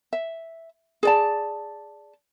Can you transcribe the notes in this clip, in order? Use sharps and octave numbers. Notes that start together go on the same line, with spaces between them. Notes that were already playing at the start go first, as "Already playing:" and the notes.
E5
G#4 D5 A5